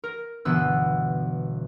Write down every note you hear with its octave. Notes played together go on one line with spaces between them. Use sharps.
A#4
G1 B2 E3 B3 E6 F#6